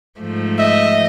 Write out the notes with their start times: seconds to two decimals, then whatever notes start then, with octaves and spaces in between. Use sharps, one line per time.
0.20 G#2 F3 A3
0.59 D#5 E5